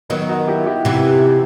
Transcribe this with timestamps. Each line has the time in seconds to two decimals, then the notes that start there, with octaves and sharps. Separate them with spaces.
0.10 D#3 F#3 B3 D#4
0.29 D#4 F#4
0.48 E4 G4
0.67 E4 G4
0.85 C3 E3